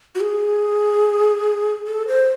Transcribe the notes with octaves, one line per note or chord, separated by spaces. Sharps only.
F#4
G#4
A4
C5